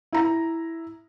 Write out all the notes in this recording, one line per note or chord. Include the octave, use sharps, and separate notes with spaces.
E4 A#5